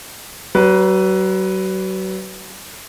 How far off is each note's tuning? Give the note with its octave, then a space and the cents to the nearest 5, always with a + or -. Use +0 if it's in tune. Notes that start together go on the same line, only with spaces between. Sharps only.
F#3 +35 B4 +0